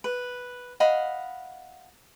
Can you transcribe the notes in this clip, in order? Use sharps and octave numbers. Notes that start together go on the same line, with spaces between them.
B4
D#5 F5 F#5 B5